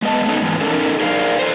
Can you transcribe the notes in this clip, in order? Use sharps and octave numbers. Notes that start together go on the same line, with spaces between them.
G#3 B3 D#5 A5
A3 B3 C#4 D#4 A4
G#2 E3 B3
C#4 D#4 A4 A#4
D#4 G#4 A#4 C5 D5 F5
A4 C5